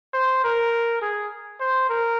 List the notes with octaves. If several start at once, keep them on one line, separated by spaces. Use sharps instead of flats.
C5
A#4
G#4
C5
A#4